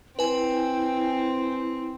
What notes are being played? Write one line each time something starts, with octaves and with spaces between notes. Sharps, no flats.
C4 E4 B4 G#5